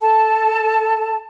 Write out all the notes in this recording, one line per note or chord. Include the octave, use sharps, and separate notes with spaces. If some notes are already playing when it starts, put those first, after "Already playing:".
A4 A5